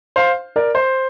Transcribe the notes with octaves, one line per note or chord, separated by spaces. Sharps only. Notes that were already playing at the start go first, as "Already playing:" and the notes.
C5 F5
A#4 D5
C5